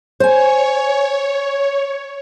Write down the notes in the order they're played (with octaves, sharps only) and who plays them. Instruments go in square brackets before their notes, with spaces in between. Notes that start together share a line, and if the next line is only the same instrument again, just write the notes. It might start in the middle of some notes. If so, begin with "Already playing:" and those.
[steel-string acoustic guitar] C5 G#5 [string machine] C#5